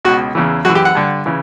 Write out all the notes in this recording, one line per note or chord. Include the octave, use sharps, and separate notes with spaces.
C#2 B2 F#4
E2 C#3 E3
F#2 E3 F#4
G4
F#5
G2 D3
C#3 E3